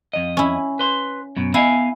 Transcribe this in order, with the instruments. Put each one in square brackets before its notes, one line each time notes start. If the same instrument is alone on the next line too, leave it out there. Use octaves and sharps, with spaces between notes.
[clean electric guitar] F2 D#5
[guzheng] C#4 E4
[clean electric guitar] B4 C6
F#2 B2
[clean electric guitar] B3 F5 G#5 [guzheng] E4